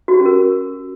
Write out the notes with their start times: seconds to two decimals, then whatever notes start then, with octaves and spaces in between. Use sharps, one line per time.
0.08 F#4
0.14 G4
0.20 C#4
0.25 A#4